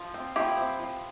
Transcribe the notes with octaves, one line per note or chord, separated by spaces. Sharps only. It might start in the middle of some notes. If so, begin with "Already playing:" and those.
Already playing: F3
C4
F3 E4 G4
C4
F3